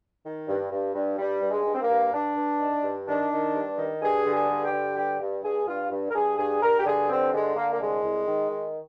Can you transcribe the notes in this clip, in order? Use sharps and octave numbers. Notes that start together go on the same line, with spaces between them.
D#3
G2
G2
G2
G2 G3
G2
G#3
G2
C4
A#3
G2
G2 D4
G2
D#3
G2
D#3 D4
D#3
G2
D#3
G2 G#4
D3
G#4
G2
G4
D3
G2 G4
G2
G2 G#4
G2 F4
G2
A#4
G2 G#4
G2 G#4
G2 A#4
G4
D3 G#4
G2 C4
D3 G#3
D3 A#3
A#3
C2 G#3
C2
D#3
D#3